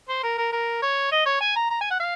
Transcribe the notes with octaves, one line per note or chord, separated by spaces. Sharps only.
C5
A#4
A#4
A#4
C#5
D#5
C#5
G#5
A#5
A#5
G#5
F#5
F5